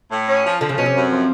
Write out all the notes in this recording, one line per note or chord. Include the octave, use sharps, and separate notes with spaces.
A2
C#4
F3
D3 F3
C#3
B2 C#4
C3
F#2
F3